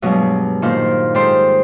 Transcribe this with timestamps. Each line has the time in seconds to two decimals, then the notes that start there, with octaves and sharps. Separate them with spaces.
0.02 G2 B2 F#3 G#3
0.62 A#2 D#3 C5 F5 C6
1.14 G#2 G4 A4 C5 C6